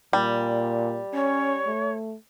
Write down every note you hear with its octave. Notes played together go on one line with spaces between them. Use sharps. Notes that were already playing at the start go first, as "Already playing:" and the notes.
A#2 G3
C#4 C#5
A3